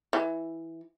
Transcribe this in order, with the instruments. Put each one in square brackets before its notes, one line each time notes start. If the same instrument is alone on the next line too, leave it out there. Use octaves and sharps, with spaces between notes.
[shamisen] E3